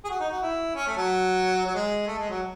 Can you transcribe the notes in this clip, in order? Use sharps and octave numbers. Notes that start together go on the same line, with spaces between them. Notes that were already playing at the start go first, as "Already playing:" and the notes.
G#4
F#4
D#4
F#4
E4
C#4
A3
F#3
F#3
G#3
A3
G#3
F#3